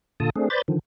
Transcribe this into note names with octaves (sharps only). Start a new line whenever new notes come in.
A#2 D3 F4 A4 A5 D#6
A3 C4 D4 G#4
B4 C5 D5 B5 G6 A6
D3 D#3 F3